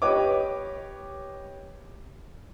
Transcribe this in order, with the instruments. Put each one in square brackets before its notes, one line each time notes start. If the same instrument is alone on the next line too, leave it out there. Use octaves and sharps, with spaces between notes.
[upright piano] G4 B4 C#5 D#5 D6